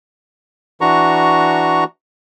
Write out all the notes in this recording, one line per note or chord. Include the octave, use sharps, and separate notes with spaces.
E3 D4 F#4 A#5 C#6